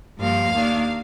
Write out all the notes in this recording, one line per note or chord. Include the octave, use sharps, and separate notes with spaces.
G2 F3 A#3 F5
D#2 D#3 A#3 D4